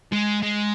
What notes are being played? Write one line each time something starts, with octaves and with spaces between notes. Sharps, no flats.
G#3
G#3